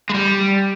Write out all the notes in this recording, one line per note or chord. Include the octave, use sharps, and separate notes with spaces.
G#3
G3